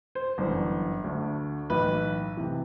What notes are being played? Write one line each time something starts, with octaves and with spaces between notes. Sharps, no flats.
C5
G1 F#2 E3
D2 D3
B1 A2 E3 B4
C3 E3